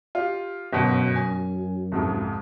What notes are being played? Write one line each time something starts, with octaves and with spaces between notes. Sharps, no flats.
F4 G4
G1 F#2 B2
G#5
C2 F2 G#2